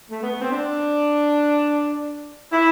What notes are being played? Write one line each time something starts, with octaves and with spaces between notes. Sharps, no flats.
A3
B3
C4
D4
E4